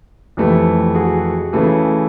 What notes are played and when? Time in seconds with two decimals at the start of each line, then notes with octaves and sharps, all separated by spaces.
0.37 F2 C3 E3 A3
0.95 F#4 G#4
1.53 C#3 E3 A3